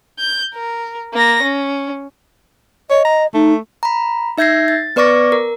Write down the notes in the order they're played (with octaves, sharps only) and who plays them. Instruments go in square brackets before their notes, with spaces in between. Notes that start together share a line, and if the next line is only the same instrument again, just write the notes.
[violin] G6
A#4
A#3 A#6
C#4
[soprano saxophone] C#5 [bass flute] D#5
[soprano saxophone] A#5
[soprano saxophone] A3 [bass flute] D#4
[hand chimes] A#5 B5
D#4 E5 G6 G#6 A#6 C7
A6
B3 B4 D5 C#6 D6 A#6
A#4